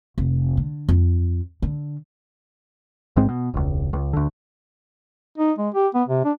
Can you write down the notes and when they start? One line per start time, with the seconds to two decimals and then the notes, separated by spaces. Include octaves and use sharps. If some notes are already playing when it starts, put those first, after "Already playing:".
0.18 F1
0.57 D3
0.89 F2
1.62 D3
3.16 A1 G#2 G#3 C4
3.29 B2
3.54 E1 C#2
3.93 C#2
4.13 D2 D3
5.38 D#4
5.58 G#3
5.74 G4
5.94 B3
6.08 C3
6.24 D4